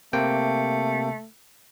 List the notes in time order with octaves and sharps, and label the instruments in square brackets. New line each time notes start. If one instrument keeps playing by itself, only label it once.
[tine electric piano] C3 A#3 G5 [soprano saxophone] A3